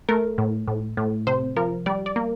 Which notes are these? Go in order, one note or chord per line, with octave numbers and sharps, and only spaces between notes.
A3 A#4
A2
A2
A2
C3 C5
F3 A#4
G3 D5
D5
A#3